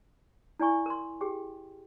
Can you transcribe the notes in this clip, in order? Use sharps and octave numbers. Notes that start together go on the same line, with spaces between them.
E4 D5 G#5 C#6
A#4 C6
G4 G#4 G5